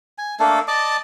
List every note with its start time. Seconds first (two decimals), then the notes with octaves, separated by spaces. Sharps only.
0.18 G#5
0.40 A3 A#3 D4 A4
0.68 D5 D#5 A5 D6